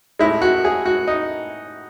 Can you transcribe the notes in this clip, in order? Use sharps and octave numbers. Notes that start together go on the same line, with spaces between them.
A2 G#3 E4
F#4
G#4
F#4
D#4